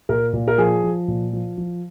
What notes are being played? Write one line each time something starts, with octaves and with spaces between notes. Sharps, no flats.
A#2 A#4
A#2
A#4
F3 G#4
F3
A#2
F3
F3